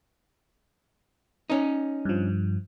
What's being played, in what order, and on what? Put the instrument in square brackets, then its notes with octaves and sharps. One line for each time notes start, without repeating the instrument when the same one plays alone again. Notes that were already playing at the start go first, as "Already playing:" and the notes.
[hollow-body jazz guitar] C#4 D#4
[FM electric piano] G2 F3